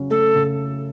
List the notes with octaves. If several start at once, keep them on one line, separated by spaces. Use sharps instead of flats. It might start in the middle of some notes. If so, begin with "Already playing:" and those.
Already playing: C#3 F#3 C#4
A3 A4
C#3